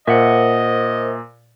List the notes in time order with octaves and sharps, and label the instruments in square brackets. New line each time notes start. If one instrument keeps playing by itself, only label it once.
[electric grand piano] A#2 [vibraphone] A#4 C5 [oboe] D#5 [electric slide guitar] E5 F#5